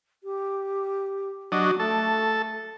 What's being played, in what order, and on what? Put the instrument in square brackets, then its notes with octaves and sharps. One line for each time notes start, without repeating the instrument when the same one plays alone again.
[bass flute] G4
[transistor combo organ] F#3 D4 D#5 [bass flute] F#4
[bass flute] A3 [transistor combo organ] A4